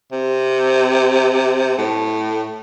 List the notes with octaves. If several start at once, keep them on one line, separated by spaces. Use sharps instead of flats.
C3
A2